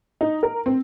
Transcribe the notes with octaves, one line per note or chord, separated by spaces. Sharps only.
D#4
A#4
C4